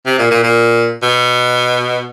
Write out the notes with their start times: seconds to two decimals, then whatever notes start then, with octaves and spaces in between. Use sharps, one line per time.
0.06 C3
0.19 A#2
0.31 A#2
0.43 A#2
1.03 B2